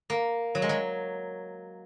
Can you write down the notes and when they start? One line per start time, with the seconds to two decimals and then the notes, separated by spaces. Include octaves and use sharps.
0.10 A#3
0.55 F#3
0.62 G#3
0.69 F#3